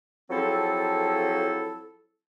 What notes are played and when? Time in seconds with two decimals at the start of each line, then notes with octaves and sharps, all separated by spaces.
0.30 F3 F#3 C4 E4 G#4 A4